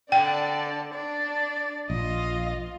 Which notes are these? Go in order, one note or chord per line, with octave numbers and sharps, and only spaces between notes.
D3 D5 G5 A5
D4 D5
A#1 F3 F4 D#5